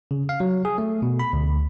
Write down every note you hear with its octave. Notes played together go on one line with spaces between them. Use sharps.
C#3
F5
F#3
G#4
A3
B2
B5
D2